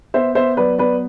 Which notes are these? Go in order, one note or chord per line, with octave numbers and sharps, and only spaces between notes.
B3 C5 E5
B3 C5 E5
F#3 B4 D5
B3 B4 D5